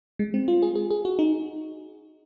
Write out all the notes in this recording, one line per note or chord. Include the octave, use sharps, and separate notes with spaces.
G#3
C4
F4
G#4
G#4
G#4
F#4
D#4